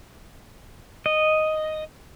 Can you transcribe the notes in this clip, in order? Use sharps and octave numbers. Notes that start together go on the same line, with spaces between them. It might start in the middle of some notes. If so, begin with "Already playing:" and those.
D#5